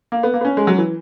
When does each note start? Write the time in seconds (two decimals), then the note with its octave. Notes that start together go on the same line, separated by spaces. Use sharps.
0.12 A#3
0.23 B3
0.34 A#3
0.41 B3
0.45 C#4
0.57 G#3
0.67 F#3
0.78 E3